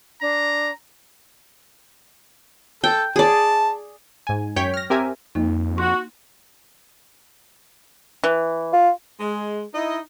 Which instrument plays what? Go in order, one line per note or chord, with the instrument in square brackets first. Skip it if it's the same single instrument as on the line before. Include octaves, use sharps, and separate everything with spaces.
[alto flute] D4 [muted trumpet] A#5
[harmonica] A4 [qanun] G5
[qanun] G#4 D5 [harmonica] A5
[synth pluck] G#2 G#5
F#2 C#5 G5 G6 B6
F6 A#6
C4 G4 A#4 E5 G#5
[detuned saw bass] F2 [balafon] A#3 D#4
[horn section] F#4 [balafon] C6
[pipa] E3
[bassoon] F4
[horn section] G#3
D#4 E4 D#5